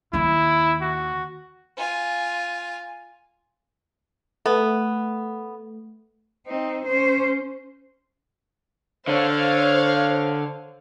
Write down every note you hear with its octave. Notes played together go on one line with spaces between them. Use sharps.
D#2 D#3 E4
F#4
F4 G#5
A3 B3
C4 D#4
C#4 C5
D3 D4 C5 C#5 F5